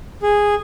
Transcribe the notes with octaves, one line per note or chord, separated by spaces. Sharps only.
G#4